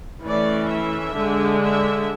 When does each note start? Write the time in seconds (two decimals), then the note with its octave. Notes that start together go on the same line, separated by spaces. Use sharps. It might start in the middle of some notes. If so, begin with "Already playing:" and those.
0.22 E3 A3 C#4 D5
0.69 E5
1.15 D3 G#3 D4
1.62 E5